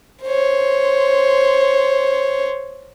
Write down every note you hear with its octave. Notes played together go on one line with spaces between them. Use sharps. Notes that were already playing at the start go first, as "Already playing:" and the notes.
C5 C#5